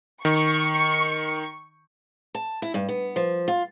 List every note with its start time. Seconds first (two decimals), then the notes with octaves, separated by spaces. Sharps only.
0.25 D#3 C#6
2.35 A5
2.62 E4
2.74 G2
2.89 B3
3.16 F3
3.48 F4